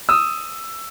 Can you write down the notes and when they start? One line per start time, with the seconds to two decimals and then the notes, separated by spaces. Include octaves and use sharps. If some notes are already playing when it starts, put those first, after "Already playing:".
0.09 D#6 E6